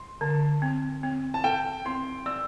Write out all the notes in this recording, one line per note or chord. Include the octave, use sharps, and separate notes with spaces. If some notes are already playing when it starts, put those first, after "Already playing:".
Already playing: C6
D3 A5
C4
C4
A5
A4 G5
C4 C6
D5 E6